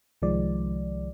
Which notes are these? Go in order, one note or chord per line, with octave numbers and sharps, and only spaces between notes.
C2 D#3 F3 G#3 D5